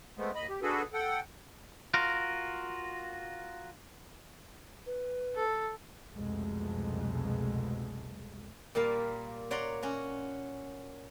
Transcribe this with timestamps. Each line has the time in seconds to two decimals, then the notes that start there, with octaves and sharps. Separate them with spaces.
0.17 G#3 A3 B3 C4
0.35 D#2 D#5 B5
0.49 G4
0.62 D4 F#4 G#4 A4 B4
0.93 A4 F#5 G5
1.94 F4 F#4 A#4
4.86 B4
5.35 A4
6.11 C2 F2 B2 G#3 A3
8.75 A#2 G3 A#3 F5
9.51 C#5 D5 F#5 A#5 C6
9.82 C#4 F#4 C#5